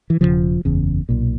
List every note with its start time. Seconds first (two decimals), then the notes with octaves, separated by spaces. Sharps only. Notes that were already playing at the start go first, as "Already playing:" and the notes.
0.10 E3
0.21 E1 D#2 C#3 F3
0.65 F#1 E2 C#3
1.09 B1 A#2